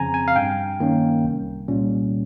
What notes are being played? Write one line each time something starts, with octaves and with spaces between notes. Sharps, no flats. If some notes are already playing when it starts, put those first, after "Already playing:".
Already playing: F2 C#3 F3 C4 G#5 A#5
G#5
F5
G2 G5
D#3 A#3 C#4
C2
A#2 G3 C#4